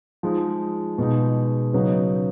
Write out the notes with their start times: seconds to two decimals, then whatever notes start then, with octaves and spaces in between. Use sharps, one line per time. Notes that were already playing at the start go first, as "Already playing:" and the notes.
0.23 F3 G#3 D#4
0.98 B2 G#3 D#4
1.73 C#3 F#3 B3 D#4